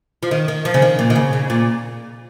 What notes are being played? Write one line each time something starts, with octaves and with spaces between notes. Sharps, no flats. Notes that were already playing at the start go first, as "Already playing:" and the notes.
F3
D#3
D#3
F3
C#3
D#3
A#2
D#3
C#3
C#3
A#2